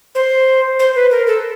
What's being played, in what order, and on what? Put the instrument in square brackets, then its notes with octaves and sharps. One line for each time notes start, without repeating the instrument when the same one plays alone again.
[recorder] C5
C5
B4
A#4
A4